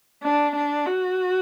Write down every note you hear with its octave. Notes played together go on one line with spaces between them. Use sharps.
D4
D4
F#4